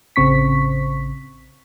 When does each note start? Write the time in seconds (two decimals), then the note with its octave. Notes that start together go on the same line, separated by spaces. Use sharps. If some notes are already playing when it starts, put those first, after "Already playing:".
0.16 A1 C#3 C4 C#6 B6